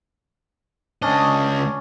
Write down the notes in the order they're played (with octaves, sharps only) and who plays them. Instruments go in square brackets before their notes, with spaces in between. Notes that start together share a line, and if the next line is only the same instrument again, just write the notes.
[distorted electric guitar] C#2 D#5 [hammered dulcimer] C#4 D4